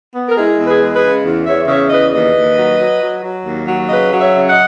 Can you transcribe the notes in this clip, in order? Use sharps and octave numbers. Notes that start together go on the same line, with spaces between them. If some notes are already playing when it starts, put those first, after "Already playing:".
B3
A#4
G#3 E4 G#4
E2
G#4 B4
G#3
G#4 B4
C#3
E2
E2 C#5 E5
C#3 C#5 E5
E2 B4 D#5
D#2 B4 D#5
D#2
F#3
F#3
F#3
F#3
D#2
F#3
C#3 B4 D#5
F#3
C#5 E5
C#3
D#5 F#5